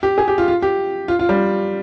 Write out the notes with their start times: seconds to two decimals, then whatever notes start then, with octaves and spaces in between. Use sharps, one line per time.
0.03 G4
0.18 G#4
0.28 G4
0.38 F4
0.48 F4
0.62 G4
1.08 F4
1.19 F4
1.29 G3